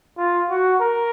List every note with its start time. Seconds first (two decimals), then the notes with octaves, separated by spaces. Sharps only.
0.18 F4
0.50 F#4
0.82 A#4